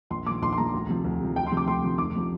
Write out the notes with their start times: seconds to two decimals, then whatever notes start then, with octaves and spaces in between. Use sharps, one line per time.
0.10 A#1 C6
0.26 A#2 F3 D6
0.42 A#1 C6
0.52 C6
0.58 A#2 F3 A#5
0.73 D2
0.89 C3 F3
1.04 D2
1.20 C3 F3
1.36 D2 G5
1.46 C6
1.52 C3 F3
1.57 D6
1.67 D2 C6
1.83 C3 F3
1.98 F1 D6
2.16 C3 F3